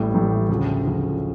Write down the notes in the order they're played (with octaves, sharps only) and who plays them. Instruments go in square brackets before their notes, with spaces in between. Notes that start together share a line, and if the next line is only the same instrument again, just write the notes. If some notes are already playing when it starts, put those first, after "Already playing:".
Already playing: [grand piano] A1 A2 G3
A1 A2 G3
D2 C#3 F3
D2 C#3 F3